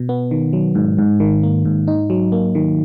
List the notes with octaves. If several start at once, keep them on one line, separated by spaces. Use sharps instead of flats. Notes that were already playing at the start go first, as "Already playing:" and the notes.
Already playing: B2
B3
D#3
F#3
G#2
G#2
D#3
A#3
G#2
D#4
F#3
A#3
D#3